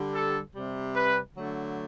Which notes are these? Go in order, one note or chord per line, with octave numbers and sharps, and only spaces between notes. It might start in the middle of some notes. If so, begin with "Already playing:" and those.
Already playing: D3 G3
A4
C3 G3
B4
D3 F#3 A3